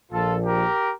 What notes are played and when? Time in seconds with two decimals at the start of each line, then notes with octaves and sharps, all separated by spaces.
0.11 A#1 A#2 F3 F4 A4
0.45 G4 A#4